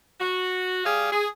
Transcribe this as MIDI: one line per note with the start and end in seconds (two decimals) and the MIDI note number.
0.20 0.80 66
0.84 1.11 55
0.84 1.11 68
0.84 1.11 77
1.12 1.26 68